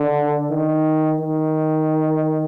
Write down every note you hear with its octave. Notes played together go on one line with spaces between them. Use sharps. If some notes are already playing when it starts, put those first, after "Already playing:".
Already playing: D3
D#3
D#3